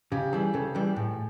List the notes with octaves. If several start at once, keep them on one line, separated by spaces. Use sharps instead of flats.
C#3 G4
E3 G3 G#4
C#3 A4
E3 G3
A2